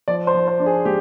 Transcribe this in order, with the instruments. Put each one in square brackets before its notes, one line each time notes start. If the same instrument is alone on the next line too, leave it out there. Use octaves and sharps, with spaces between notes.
[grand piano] F3 D5
C5
F3
C5
D4
G#4
G#3 G4